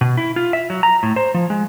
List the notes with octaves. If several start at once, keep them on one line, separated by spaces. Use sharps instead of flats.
B2
E4
F4
E5
F#3
A#5
A2
C5
F3
G#3